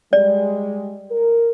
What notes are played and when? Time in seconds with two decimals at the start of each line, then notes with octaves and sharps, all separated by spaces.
0.13 G3 G#3 D5
1.11 A#4